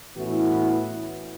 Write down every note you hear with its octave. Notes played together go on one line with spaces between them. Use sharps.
A2 E3 B3 C#4 E4 F#4